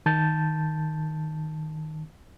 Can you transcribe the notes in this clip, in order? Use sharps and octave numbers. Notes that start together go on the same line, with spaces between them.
D#3 A5 G6 A6